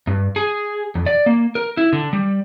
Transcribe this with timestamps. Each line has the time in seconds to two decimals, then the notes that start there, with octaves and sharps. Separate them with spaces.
0.07 G2
0.36 G#4
0.95 F2
1.06 D5
1.26 A#3
1.55 A#4
1.77 E4
1.93 D3
2.13 G3